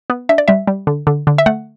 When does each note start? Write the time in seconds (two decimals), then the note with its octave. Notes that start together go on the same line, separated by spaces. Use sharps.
0.10 B3
0.29 D4 E5
0.38 D5
0.48 G3 E5
0.67 G3
0.87 D3
1.07 D3
1.27 D3
1.38 E5
1.46 A3 F#5